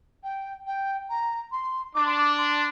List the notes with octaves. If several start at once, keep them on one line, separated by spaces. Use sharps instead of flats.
G5
G5
A#5
C6
D4 D6
C6
D6
C6